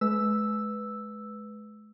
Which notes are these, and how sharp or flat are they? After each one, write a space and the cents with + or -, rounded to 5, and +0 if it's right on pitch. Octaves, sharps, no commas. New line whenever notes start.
G#3 +40 B4 +0 E6 +0